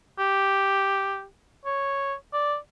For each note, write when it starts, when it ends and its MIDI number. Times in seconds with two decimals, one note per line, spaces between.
0.19 1.25 67
1.65 2.14 73
2.33 2.56 74